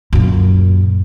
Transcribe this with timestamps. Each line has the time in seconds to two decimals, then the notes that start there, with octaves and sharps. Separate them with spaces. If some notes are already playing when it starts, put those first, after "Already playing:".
0.13 F#2 A#2